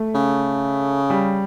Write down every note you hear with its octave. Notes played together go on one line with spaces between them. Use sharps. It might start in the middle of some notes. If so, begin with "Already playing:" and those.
Already playing: A3
C#3
G3